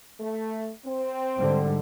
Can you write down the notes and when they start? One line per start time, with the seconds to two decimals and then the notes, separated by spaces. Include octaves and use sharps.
0.20 A3
0.86 C4
1.37 G#2 D3 G3